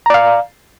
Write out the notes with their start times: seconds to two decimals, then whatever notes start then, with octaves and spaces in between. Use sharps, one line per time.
0.06 A#5
0.10 D5
0.14 F5